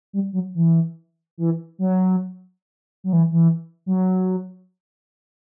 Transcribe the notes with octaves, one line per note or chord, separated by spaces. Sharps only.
G3
F#3
E3
E3
F#3
F#3
E3
E3
F#3